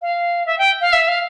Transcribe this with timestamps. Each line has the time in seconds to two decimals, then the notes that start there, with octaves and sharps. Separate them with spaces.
0.02 F5
0.46 E5
0.58 G5
0.81 F5
0.93 E5
1.08 F5